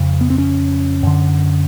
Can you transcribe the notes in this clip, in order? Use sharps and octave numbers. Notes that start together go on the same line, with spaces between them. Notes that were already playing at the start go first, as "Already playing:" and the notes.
Already playing: F2 C#3
B3
C4
C#4
F#2 D3